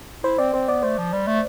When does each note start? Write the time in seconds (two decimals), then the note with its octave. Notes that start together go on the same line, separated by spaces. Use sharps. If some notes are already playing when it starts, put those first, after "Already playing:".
0.24 E4 C5
0.38 C4 D5
0.54 C4 C5
0.68 B3 D5
0.83 A3 C5
0.98 F3
1.13 G3
1.27 A3